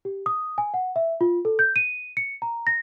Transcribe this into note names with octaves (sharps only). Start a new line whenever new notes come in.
G4
D#6
G#5
F#5
E5
F4
A4
G6
D#7
C#7
A#5
A#6